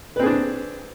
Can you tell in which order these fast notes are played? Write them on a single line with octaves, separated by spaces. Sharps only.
B4 C4 G#4 D4